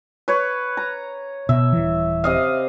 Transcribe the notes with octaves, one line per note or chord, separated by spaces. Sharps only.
B4 C#5
A#5
B2 E5
D#1 E3
C3 D#5 F5